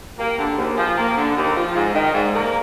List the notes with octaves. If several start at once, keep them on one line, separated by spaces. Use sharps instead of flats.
A#3 G4 A#4
D3 G4 A#4
D#2 G#4 C5
F3 F5 G#5
A#3 G5 A#5
D3
D#2
F3
G#2 F5 G#5
D#3 D#5 G5
G#2 D5 F5
A#3 A#4 D5